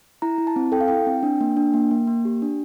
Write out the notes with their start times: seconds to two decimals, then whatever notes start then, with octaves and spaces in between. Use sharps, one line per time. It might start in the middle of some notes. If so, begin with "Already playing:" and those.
0.22 E4 A#5
0.38 E4
0.47 A5
0.56 C4
0.72 A4 G5
0.81 F5
0.88 E4 G5
1.07 C4
1.23 D4
1.41 A#3
1.57 D4
1.74 A#3
1.91 A#3
2.07 A#3
2.25 G4
2.42 D4